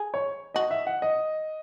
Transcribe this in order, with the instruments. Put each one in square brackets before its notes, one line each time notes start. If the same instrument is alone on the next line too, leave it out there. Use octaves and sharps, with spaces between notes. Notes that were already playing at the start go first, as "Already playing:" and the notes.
Already playing: [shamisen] G#4
[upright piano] C#5
[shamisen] F#4 [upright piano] D#5
[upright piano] E5
F#5
D#5